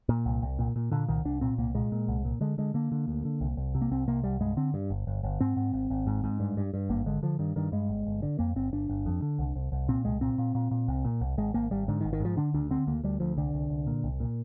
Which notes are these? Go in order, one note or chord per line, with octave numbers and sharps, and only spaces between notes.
A#2
C2
C2
A#2
A#2
A#2 D3
C2 D#3
C2 D4
A#2 C4
C2 A#3
A#2 G#3
A#2
C2
A#2
D3 G#3
D3 G#3
D3 A#3
D3
D2
D3
C2
C2
C3
A#3
C2 C4
C3 A#3
C2 G3
G2 G#3
D3 C4
G2
G1
G1
G1
G#2 C4
G#2
G#1
G#1
G#2
G#2
G2
G2
G2
G#1 A#3
D3 G#3
D3 F3
G2 D#3
G2 D#3
G2 G#3
G1
G1
D3
F2 A#3
G1 C4
G1 D4
G1
F2
D3
C2
C2
C2
A#2 C4
C2 G#3
A#2 C4
A#2
A#2
A#2
C2
A#2
C2
G#1 G#3
G#1 A#3
G#1 G3
G#2 D3
D#3
G#1
D#3
G#2 F3
D3 D4
D2 D4
D3 C4
D2 A#3
D2 G3
D2 F3
C2 D3
C2
C2
A#2
C2
A#2